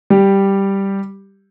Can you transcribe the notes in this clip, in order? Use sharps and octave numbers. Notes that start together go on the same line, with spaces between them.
G3 G4